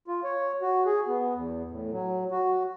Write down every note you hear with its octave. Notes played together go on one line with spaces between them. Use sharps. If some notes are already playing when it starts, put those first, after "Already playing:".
F4
C#5
F#4
G#4
B3
E2
A2
F#3
F#4